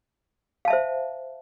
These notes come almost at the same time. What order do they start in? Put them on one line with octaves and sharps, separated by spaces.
F5 A5 E5 C5